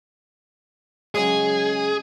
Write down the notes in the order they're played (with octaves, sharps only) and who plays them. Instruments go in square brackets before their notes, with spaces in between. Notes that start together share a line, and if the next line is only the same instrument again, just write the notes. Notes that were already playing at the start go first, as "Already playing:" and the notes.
[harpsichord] C#3 F#3 G#3 [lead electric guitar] G#4